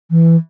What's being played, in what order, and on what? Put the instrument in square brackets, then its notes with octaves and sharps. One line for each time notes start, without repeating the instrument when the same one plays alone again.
[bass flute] E3